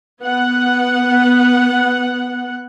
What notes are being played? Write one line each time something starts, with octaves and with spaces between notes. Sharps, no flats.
B3 F#5